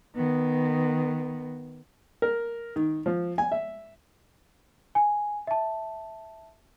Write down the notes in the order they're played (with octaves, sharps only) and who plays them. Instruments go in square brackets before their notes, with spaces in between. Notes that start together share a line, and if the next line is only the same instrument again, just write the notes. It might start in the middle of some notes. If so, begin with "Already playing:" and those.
[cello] D#3 [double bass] B3
[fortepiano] A#4
D#3
F3
G#5
E5
[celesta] G#5
E5 A5